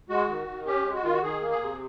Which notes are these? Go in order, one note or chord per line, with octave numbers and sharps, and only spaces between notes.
G#3 F#4
D#3
D#3
C#4 G4
G#3
F#4
D#3 F4
F#4
D#3 G#4
A#3
G#4
C3